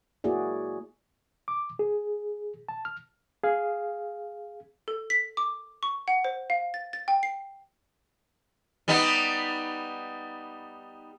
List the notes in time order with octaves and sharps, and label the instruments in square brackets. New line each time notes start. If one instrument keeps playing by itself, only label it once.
[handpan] A#3 E4 F#4 G#4 D5
[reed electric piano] D6
G#4
A5
F6
G#4 F5
[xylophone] A4
B6
D6
C#6
F#5
C5
F5
A6
A6
G5
C7
[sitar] G3 B3 D#4